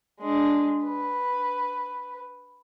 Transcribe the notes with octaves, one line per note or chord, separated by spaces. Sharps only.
G#3 D4
B4